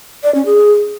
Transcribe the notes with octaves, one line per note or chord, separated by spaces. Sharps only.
D5
C#4
G#4